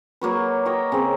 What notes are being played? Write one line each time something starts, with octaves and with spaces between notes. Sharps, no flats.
F#3 A#3 F#4 B4
A#4 C#5 D#5 G5
C#3 C4